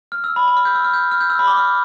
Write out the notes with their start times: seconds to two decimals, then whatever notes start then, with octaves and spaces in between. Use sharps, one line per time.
0.12 F6
0.24 E6
0.36 B5
0.48 B5
0.57 F6
0.65 G6
0.75 E6
0.84 F6
0.94 G6
1.11 F6
1.20 G6
1.30 E6
1.39 B5
1.47 D6
1.57 F6